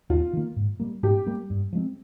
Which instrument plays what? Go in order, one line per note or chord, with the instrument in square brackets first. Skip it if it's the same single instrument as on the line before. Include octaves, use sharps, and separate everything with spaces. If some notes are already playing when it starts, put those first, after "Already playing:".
[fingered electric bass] D#2 [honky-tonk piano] F4
[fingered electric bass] D#3 A#3
G#2
G3 A#3
[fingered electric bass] G#2 [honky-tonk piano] G4
[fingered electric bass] G3 A#3
G2
F3 G#3 C4